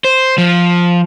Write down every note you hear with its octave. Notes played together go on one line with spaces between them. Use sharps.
C5
F3